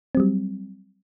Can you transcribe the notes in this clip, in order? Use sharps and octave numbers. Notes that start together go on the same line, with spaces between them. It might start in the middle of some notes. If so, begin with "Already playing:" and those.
F#3 G3 C4